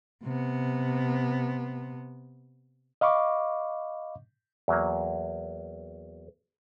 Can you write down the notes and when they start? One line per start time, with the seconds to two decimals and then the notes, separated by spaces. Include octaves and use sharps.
0.24 C3 B3
3.01 D#5 F5 B5 C#6 D6
4.68 E2 F#3 A#3